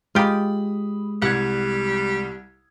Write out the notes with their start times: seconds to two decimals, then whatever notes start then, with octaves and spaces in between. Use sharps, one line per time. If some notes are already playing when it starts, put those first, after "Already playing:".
0.15 G#3 F4 G4 B5 D#6
1.22 C2 G3 F#5 G#6